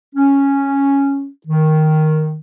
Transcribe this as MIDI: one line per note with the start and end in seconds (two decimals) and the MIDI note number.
0.14 1.28 61
1.47 2.38 51